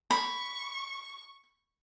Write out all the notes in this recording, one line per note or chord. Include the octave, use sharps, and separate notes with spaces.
B5 C#6